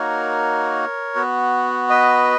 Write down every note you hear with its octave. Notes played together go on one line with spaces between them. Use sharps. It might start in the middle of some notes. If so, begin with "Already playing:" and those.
Already playing: A#3 D#4 F#4 A#4 C#5
B3 F#4
B4 D#5